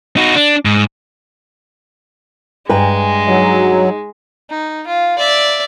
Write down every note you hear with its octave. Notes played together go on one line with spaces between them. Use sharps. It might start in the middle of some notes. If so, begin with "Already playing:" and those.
D#4 F#4
D4
G#2
G2 G#3 B4 G5 G#5 A#5
F#3 D#4 G#4
D#4
F4
D5 E5